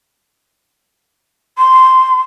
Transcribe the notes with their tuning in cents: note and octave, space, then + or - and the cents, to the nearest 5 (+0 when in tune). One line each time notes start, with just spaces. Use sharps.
C6 -10